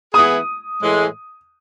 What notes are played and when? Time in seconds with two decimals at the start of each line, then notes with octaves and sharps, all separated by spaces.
0.14 E3 B3 E4 G#4 D#6
0.81 A2 E3 G#3